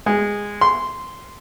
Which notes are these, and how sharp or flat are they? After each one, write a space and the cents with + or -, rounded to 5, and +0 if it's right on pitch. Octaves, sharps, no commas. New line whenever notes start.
G#3 -15
C6 -10